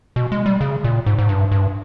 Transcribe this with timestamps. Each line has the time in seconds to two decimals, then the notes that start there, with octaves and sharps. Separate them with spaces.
0.16 B2
0.32 G#3
0.46 G3
0.61 C#3
0.84 A#2
1.06 G#2
1.19 G#2
1.29 G2
1.52 G2